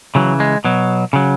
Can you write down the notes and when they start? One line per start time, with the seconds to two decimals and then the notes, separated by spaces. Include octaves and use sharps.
0.15 C#3 E3 F#3
0.40 G#3
0.65 B2 F#3
1.13 C#3 F#3